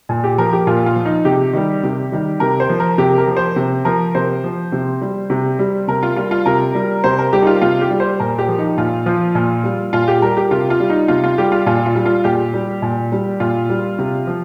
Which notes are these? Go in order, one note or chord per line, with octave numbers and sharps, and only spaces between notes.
A#2
G4
F3 A#4
G4
A#2 F4
F4
F3
D#4
C3 G4
D#3 G3
C3
D#3 G3
C3 A#4
C5
F3
A#4
C3 G4
A#4
F3
C5
C3
F3 A#4
C3 C5
F3
C3
G3
C3
G3
C3 A#4
F4
G3 F4
F4
C3 A#4
G3
C3 C5
A#4
G3 G4
D#4
F4
C3 F4
G4
G3
C5
A#2 A#4
G4
F3
D#4
A#2 F4
F3 F4
A#2
G3
A#2 F4
G4
G3 A#4
G4
C3 F4
F4
G3
D#4
C3 F4
F4
G3 G4
F4
A#2 F4
F4
G3
F4
A#2 G4
G3
A#2
G3
A#2 F4
G3
C3
F3